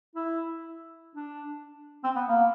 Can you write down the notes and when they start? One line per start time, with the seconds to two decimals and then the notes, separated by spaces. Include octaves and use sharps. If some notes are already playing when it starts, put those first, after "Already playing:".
0.15 E4
1.15 D4
2.04 C4
2.16 B3
2.28 A#3